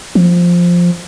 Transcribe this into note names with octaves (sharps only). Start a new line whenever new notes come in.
F3